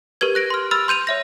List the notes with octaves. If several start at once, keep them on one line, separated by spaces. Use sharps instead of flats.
G4 A#4 B4 G#6
F#6 A#6 D7
C6 F6
B5 E6 F6 A6
C6 G6 D#7 F7
C#5 E5 A#6